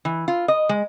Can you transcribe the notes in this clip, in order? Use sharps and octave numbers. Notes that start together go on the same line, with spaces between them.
E3
F4
D#5
G#3